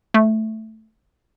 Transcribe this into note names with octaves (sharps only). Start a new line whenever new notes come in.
A3